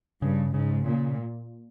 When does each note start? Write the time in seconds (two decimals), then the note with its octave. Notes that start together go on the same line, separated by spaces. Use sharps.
0.22 G2 C#3
0.54 G#2 C#3
0.86 A#2 C#3